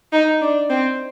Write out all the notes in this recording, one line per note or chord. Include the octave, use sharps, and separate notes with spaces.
D#4
D4
C4